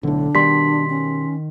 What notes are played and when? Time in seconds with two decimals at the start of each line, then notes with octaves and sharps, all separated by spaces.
0.03 B1 A2 D3 D4
0.35 B2 D#3 G3 C6 B6
0.90 C#4